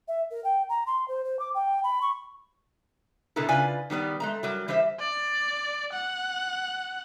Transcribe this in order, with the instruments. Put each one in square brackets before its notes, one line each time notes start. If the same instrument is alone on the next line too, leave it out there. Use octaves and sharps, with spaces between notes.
[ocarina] E5
A#4
G5
A#5
C6
C5
C5
D6
G5
B5
C#6
[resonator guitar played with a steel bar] B2 D3 B3 E4 A4 A#4
C#3 F4 B4 D5 G#5
D#3 G3 B3 D5
G#3 A3 A#5
F#3 G3 A#4
E3 G3 G4 C5 E5
[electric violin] D5
F#5